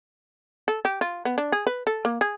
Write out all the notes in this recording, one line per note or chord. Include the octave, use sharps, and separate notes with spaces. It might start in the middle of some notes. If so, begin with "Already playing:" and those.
A4
G4
F4
B3
D4
G#4
B4
A4
A#3
G#4